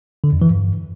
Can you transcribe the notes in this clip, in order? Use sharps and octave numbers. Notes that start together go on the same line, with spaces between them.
D3
F2
E3
G2